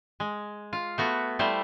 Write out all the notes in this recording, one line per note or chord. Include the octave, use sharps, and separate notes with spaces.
G#3
F4
A3 B3 F#4
G3 A3 E4 C5